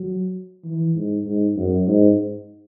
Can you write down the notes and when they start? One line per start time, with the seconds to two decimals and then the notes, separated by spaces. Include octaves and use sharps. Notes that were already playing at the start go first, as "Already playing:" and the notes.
Already playing: F#3
0.64 E3
0.96 G#2
1.27 G#2
1.57 F#2
1.87 G#2